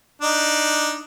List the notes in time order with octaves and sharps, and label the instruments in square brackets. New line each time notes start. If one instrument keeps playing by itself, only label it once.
[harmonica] D4 D#4